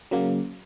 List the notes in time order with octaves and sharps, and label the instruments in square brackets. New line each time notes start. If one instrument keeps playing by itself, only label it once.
[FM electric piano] C#3 F#3 A#3